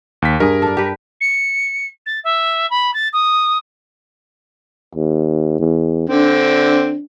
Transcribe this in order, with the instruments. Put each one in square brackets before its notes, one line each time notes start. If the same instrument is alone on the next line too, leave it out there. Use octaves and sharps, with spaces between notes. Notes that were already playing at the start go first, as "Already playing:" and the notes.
[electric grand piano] D#2 B6
[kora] G2 G#4 [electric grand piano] A#4
[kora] D4 A4
G4 B4
[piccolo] C#7
A6
E5
B5
A6
D#6
[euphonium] D#2
E2
[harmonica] D3 C4 [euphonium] D4